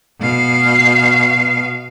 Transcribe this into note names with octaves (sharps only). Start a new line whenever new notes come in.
B2 F5